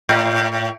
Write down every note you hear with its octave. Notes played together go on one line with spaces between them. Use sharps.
A2